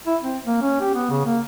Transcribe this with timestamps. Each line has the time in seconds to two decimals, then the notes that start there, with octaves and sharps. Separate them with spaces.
0.06 E4
0.22 C4
0.45 A#3
0.61 C#4
0.80 G4
0.94 B3
1.10 C#3
1.25 A#3